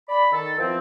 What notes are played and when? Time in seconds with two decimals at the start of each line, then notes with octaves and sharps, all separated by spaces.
0.09 D5 B5
0.32 D#3 A4
0.58 E2 F3 C4